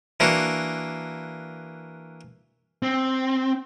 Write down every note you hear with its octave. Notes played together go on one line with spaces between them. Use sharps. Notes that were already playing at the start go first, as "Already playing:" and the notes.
E3 A#3 D4 F#4
C4